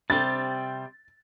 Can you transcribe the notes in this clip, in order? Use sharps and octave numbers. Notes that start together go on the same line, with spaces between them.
C3 G3 C4 A6